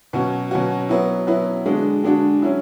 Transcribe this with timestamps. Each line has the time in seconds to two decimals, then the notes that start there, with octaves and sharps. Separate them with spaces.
0.13 B2 F#3 C#4 F#4
0.51 B2 F#3 C#4 F#4
0.89 F#3 B3 E4
1.27 F#3 B3 E4
1.66 D3 G#3 D4 F#4
2.04 D3 G#3 D4 F#4
2.42 F#3 C#4 E4